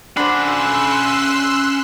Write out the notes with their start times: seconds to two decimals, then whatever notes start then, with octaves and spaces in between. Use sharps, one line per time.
0.17 C#4 D4 F#4 C5 B5 C6 E6 F#6